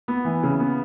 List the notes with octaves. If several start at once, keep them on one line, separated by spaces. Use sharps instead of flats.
B3
E3
C#3
B3